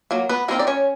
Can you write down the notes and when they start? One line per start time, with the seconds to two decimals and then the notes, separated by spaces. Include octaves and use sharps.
0.11 F#3 A#3
0.29 B3 B4
0.48 G#3 A#3 C4 D#4 A#4
0.59 D5
0.67 C#4 C#5